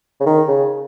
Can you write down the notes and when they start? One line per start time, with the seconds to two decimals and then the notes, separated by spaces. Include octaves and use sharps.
0.20 C#3
0.26 D#3
0.48 C#3